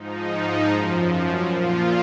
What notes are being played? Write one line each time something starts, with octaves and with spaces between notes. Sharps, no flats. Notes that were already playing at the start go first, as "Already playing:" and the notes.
Already playing: G#2 F3 D#4
F#2 F3
A#2 F3 F4